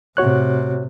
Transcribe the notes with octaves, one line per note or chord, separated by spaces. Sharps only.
A2 C3 F#4 C#5 F#6